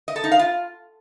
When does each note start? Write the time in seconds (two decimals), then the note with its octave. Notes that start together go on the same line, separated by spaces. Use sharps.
0.08 D#5
0.16 A4
0.24 D#4
0.32 F5
0.39 F4